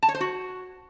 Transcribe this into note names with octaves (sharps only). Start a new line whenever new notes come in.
A5
C#5
C5
F#4